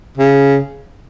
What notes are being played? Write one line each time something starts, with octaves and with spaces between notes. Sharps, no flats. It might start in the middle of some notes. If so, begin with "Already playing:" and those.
C#3